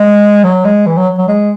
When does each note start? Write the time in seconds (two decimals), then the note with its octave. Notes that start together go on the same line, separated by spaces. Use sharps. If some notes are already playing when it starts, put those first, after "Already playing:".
Already playing: G#3
0.44 F#3
0.65 G#3
0.86 E3
0.97 F#3
1.18 F#3
1.28 G#3